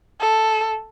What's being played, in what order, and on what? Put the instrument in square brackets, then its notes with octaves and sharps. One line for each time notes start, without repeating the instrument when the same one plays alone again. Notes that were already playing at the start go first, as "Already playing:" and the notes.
[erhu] A4